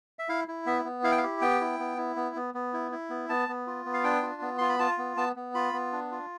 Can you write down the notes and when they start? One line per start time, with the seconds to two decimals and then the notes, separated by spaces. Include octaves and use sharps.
0.19 E5
0.29 E4 F5
0.48 E4
0.66 B3 E5
0.85 B3
1.03 E4 F5
1.11 G5
1.18 F5
1.23 G4
1.41 B3 G5
1.61 E4
1.79 B3
1.98 E4
2.16 B3
2.36 B3
2.54 B3
2.73 E4
2.92 E4
3.10 B3
3.29 B3 A5
3.49 B3
3.67 F4
3.85 B3
3.94 F5
4.04 D4 G5
4.23 F4
4.42 B3
4.58 F4 C6
4.69 B5
4.79 F4 A5
4.98 B3
5.17 B3 A5
5.36 B3
5.54 F4 B5
5.73 B3
5.92 D4
6.11 F4